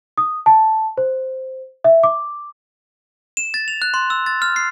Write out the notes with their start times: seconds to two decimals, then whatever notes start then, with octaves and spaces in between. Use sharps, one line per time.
0.18 D#6
0.46 A5
0.98 C5
1.84 E5
2.03 D6
3.37 E7
3.54 A6
3.68 F7
3.82 F#6
3.94 C6
4.10 E6
4.26 A6
4.42 F6
4.56 C7